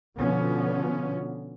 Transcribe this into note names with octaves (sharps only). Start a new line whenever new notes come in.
B2 D3 F3 B3 C#4